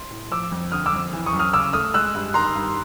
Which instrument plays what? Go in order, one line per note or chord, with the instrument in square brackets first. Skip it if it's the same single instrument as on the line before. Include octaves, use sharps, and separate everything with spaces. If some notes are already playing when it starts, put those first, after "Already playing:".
Already playing: [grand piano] C6
A2
F3 D6 E6
F2
D3 D#6 F6
D6 E6
F2
E3
C#6 D#6
F#2
D#6 F6
C#3 D6 E6
A3 D#6 F6
G#3 E6 F#6
G2
D#3 A#5 C6
G2